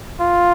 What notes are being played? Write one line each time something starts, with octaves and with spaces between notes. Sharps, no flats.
F4